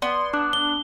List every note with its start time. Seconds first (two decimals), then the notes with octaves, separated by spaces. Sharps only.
0.02 B3 D5 C6
0.33 D4 D6 F#6
0.53 G7